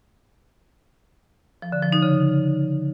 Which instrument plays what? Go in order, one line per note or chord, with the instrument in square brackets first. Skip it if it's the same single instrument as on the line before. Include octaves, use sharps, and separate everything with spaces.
[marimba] F3
D3
F3
D#4
C#3